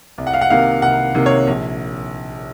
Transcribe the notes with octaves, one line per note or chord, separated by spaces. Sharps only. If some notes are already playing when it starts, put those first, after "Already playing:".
C2
F#5
F5
F#5
C3 D#3 A#3 F5
C2 F#5
C3 D#3 A#3
C#5
A#1